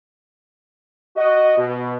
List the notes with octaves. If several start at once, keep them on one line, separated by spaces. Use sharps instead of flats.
F#4 D#5
B2